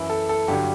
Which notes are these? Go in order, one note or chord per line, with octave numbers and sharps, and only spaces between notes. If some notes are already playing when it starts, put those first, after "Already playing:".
Already playing: F#2 E3 E4
A4
A4
G2 D3 F#3 G4